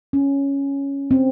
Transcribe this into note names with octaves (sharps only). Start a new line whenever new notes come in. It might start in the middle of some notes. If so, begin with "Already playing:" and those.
C#4
C4